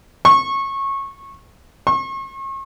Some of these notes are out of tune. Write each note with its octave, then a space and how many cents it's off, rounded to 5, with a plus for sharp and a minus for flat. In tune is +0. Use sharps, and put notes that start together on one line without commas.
C#6 -20
C#6 -40